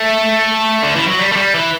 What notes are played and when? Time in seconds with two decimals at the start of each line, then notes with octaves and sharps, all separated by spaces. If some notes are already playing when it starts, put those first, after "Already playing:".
Already playing: A3
0.83 D3
0.95 E3
1.07 F#3
1.19 G3
1.32 A3
1.36 G3
1.54 E3